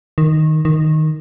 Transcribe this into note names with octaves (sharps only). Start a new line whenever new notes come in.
D#3
D#3